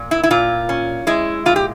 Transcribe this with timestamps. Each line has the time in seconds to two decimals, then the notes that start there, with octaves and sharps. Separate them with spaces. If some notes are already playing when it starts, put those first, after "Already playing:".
Already playing: A#2
0.11 E4
0.23 E4
0.30 A#2 F4
0.69 C#4
1.07 G#3 E4
1.46 A#2 F4
1.56 G4